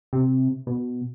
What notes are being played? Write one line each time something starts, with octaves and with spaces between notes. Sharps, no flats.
C3
B2